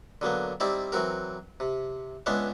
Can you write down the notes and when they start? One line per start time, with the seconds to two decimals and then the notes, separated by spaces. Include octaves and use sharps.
0.21 D3 F#3 A#3 B3
0.60 G3 C4 D#4 E4 D5
0.92 E3 F#3 C4 F#4 A#4
1.60 C3
2.26 C#2 G#3 B3 C#4 D4 E5